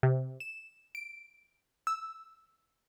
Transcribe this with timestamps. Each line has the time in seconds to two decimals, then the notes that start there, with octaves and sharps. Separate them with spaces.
0.03 C3
0.40 E7
0.95 D7
1.87 E6